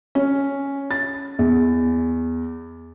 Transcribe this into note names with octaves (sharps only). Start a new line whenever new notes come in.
C#4
A6
E2